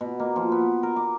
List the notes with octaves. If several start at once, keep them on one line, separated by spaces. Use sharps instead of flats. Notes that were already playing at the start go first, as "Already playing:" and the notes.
B2
A#3
F3
B3
A#4
D6